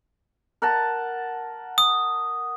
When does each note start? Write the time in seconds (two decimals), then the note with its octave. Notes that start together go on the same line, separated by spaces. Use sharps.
0.62 A#4 F#5 A5
1.78 D#6